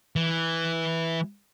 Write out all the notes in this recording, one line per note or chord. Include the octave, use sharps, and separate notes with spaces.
E3